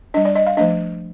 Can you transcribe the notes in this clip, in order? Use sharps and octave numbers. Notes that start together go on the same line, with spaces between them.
G3 D4 D#5
D5
D#5
F5
F3 A3 D4 D#5